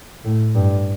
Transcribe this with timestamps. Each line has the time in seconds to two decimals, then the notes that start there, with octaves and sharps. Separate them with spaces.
0.25 A2
0.55 G2